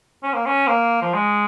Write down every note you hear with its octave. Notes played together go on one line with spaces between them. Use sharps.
C#4
A#3
C#4
A#3
F3
G#3